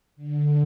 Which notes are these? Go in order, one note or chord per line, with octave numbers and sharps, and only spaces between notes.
D3